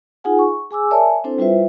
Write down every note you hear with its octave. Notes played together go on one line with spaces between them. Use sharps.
D#4 F4 G#4 F#5 G#5
C#6
G#4 G#5 D6 E6
A#4 C#5 D5 E5 G#5 A5
C4 D4 E4 A4 C5
G3 E4 F4 B4 C5 E5